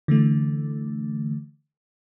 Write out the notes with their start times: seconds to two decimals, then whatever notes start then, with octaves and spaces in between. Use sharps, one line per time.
0.08 D3 E3 A3